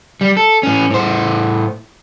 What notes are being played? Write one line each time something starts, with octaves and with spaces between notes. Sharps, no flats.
G3
A4
A2 C#4
A2 C5